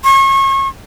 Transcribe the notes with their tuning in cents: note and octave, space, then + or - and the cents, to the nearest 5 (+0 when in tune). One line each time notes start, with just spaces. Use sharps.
C#6 -35